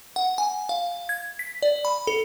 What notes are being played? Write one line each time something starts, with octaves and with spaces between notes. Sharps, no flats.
F#5
G#5
F5
G#6
B6
D5
B5
A4